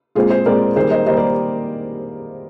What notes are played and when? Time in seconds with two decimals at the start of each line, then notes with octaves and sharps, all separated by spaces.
0.15 A#2 G#3 C4 F4 G#4
0.30 G#4 C5
0.46 A#2 G#3 C4 A#4 D5
0.76 D#3 G3 A#3 G#4 C5
0.91 C5 D#5
1.06 D#3 G3 A#3 C5 D#5
1.17 A#4 D5